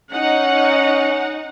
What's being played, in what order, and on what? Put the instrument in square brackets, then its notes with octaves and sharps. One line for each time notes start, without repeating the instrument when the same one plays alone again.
[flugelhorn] C#4 [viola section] D#4 F#5